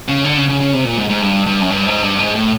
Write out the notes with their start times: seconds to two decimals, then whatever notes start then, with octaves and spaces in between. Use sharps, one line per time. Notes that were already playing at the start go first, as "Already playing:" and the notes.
0.08 C#3
0.25 D3
0.37 C#3
0.49 C#3
0.60 C#3
0.73 C3
0.85 A#2
0.97 G#2
1.10 G#2
1.22 G2
1.46 G2
1.61 F#2
1.70 G2
1.87 G#2
2.02 G2
2.19 G#2
2.35 A2